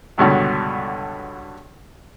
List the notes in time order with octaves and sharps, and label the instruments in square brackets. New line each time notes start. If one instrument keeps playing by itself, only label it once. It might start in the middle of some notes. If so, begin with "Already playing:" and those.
[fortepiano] C#2 G2 B2 D3